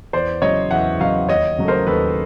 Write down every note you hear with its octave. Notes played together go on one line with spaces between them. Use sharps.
E2 C5 D5
C#3 F#3 C#5 D#5
E2 E5 F#5
C#3 F#3 D#5 F5
D#2 C#5 D#5
C#3 F#3 A3
A#4 C5
D#2 A4 B4